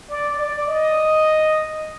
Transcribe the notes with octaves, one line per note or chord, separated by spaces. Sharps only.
D5
D5
D#5